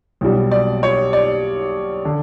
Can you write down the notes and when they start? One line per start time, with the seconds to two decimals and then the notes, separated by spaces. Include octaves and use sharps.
0.21 B1 B2 G3
0.51 D5
0.83 C#5
1.13 D5
2.05 D3